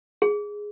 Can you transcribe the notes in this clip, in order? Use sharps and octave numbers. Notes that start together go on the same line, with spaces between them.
G#4